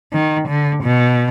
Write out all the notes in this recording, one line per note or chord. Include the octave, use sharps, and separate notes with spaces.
D#3
D3
B2